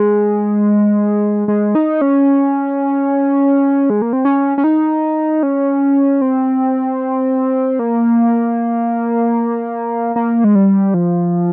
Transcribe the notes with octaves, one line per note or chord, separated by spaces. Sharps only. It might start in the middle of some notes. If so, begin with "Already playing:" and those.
Already playing: G#3
G#3
D#4
C#4
G#3
A#3
C4
C#4
C#4
D#4
C#4
C4
A#3
A#3
G#3
G3
F3